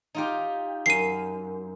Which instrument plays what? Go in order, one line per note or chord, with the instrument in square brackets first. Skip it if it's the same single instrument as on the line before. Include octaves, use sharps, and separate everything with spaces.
[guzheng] D#4 F4 G4
[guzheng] F#2 [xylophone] C7 D#7